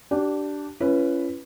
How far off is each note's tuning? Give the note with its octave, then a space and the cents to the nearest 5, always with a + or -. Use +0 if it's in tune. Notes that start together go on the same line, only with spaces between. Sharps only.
D4 +0 G4 -25
C#4 +0 E4 +45 B4 +0